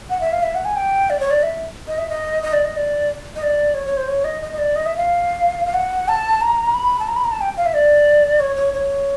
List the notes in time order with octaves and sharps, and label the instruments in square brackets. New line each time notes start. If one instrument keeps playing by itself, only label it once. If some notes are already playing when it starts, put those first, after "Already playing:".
[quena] F#5
E5
F5
E5
F#5
G#5
G5
D5
C#5
D5
E5
D#5
E5
D#5
D#5
D5
D#5
D5
D#5
D5
C#5
C#5
C5
C#5
D#5
D#5
D#5
D5
D#5
E5
F5
F5
F#5
A5
A#5
B5
A5
A#5
B5
A#5
A5
G5
F5
E5
D5
C#5
C#5
C#5